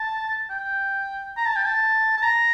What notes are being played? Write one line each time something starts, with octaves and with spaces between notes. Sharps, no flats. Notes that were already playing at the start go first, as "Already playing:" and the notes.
Already playing: A5
G5
A#5
A5
G5
A5
A5
A#5